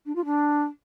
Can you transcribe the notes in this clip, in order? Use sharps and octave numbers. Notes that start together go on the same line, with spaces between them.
D4
F4
D4